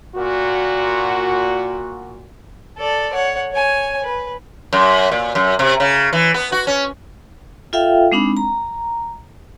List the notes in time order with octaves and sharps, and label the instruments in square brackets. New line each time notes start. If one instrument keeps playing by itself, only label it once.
[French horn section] A#2 F#4
[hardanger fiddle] A4 D5
C#5 F#5
C#5 G#5
B4
[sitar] F#2
A#2
F#2
C3
C#3
E3
B3
F#4
C#4
[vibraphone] F4 A4 E5 F5 G5
G#3 C4 D4 D#4 B5
A#5